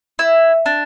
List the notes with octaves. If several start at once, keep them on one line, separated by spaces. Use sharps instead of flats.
E4
D4